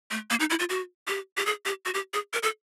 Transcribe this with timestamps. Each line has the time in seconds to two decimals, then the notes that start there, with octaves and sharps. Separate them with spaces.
0.11 A3
0.30 A#3
0.40 D#4
0.50 E4
0.59 F4
0.69 F#4
1.07 G4
1.37 G4
1.46 G#4
1.65 G4
1.85 F#4
1.94 G4
2.13 G#4
2.33 A#4
2.43 A4